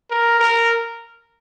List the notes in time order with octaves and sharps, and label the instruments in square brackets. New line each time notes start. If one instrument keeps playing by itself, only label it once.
[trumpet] A#4
A#4